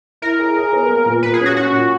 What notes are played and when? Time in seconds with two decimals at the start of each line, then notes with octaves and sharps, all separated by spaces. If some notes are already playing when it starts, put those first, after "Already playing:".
0.22 E4 A#4
0.39 G#4
0.56 G#4
0.73 B3
0.89 A#3
1.06 A#2
1.22 A#2 B4
1.34 G#4
1.40 C#4
1.46 F#4
1.56 C#4 F#4
1.73 A#2